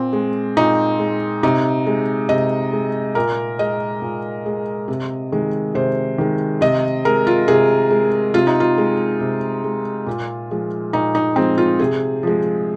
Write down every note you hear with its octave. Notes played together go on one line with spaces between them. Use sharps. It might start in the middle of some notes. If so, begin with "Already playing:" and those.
Already playing: A#2 C4
G#3
A#2 D#4
G#3
C3 D#4
G#3
C3 D#5
G#3
A#2 A#4
G#3 D#5
A#2
G#3
C3
D#3 G#3
C3 C5
D#3 G#3
C3 D#5
G#3 A#4
F4
C3 G#4
G#3
C3 F4
D#4
F4
G#3
C3
G#3
A#2
F3 G#3
A#2 D#4
D#4
F3 G#3 C4
F4
C3 G#4
F3 G#3